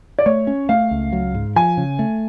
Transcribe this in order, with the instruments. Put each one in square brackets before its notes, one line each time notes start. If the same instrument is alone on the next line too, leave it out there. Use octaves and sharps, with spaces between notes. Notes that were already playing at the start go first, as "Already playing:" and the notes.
[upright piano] D5
[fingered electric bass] A3 [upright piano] C#5
[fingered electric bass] C#4
[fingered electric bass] A3 [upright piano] F5
[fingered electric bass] C#2
F#3
G#2
[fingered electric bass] F3 [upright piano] G#5
[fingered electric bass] C#3
A3